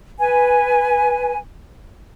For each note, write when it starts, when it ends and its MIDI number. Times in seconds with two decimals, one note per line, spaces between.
0.20 1.37 71
0.20 1.37 80